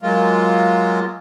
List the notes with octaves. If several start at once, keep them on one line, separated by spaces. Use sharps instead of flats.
F#3 G#3 A#3 F4